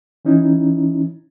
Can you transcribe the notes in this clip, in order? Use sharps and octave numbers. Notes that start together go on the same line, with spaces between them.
E3 C#4 D#4 E4